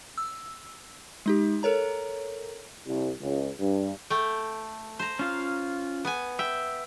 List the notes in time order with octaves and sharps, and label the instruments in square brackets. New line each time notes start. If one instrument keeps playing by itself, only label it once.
[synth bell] E6
G#3 D#4 G4
A4 A#4 C#5 A#5
[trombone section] C2
C#2
G2
[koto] A3 G5
C5 A#5
[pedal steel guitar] C#4 F4 F5
[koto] B3 G#5
[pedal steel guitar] E5 [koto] G5